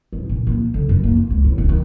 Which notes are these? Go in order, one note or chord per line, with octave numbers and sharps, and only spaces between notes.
G#2
A#2
A#3
D3
F#2
A#3
F4
C#2
A2
D1
D#3